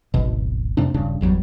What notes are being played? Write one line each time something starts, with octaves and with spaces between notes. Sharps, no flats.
D1 G#1 B2
F2 C3 A#3 D4
D#1 G2 C#3 D4
G1 E2 F#3 G3